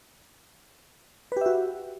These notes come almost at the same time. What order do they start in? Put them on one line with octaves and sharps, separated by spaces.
B4 G4 E5 F#4